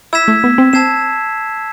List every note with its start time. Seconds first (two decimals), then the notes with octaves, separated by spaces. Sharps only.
0.13 E4 E6 G#6 B6 E7
0.28 A3
0.44 B3
0.58 C4
0.73 C4 A5 E6 G#6 C7 E7